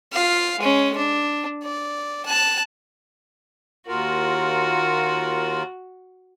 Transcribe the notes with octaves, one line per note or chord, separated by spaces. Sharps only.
F4 F5
G#3 C#4
D4
D5
A5 F#6
D#2 F4 F#4 A#4